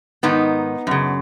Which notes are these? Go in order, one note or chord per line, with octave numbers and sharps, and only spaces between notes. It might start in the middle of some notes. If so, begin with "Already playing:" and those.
G#2 D#3 B3 D#4
F#2 C#3